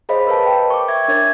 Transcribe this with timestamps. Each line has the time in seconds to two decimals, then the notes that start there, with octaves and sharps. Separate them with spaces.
0.09 G#4 C5 C#5 D#5 F5 B5
0.27 A#4 B4 C#5 F5 A5
0.46 G5
0.70 C#6 D6
0.88 E5 G#6
1.08 D4 A#4 C#5 G#6 A6